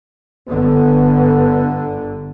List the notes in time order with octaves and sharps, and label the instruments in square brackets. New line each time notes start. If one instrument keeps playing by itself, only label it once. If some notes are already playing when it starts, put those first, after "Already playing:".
[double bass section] G1 D3 [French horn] B3